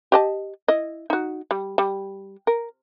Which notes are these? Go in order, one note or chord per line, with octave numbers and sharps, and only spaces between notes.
G4 D#5 A5
E4 D#5
D#4 F#4
G3
G3
A#4